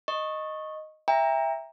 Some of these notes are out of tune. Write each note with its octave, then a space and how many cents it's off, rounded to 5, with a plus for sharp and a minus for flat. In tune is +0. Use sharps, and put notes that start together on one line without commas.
D#5 +0 C#6 -15
E5 +0 G5 +30 A#5 +0